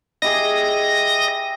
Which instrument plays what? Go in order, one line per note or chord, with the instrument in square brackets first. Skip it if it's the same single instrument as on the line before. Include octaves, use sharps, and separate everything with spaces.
[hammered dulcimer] E4 G4 G#4 [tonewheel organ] D#5 A#6